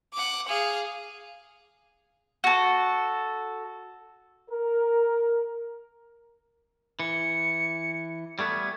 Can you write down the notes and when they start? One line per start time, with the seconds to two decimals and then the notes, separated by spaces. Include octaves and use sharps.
0.14 F#5 D6
0.48 G#4 F5
2.44 F#4 A4
4.50 A#4
7.00 E3 C#7
8.39 G3 A3 B3 G#6